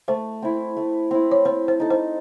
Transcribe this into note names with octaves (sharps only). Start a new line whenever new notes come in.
A3 C5
C4 E4
A3
C4 E4
C#5
C4 C5
C5
D#4 A4
C5